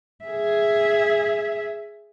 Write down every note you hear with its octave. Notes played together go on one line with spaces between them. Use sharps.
G#4 E5